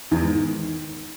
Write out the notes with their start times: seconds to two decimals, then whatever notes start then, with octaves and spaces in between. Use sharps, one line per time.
0.11 E2
0.22 G#2
0.32 D#3